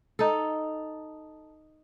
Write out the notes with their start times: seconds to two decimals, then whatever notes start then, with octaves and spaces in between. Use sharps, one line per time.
0.19 D#4 A4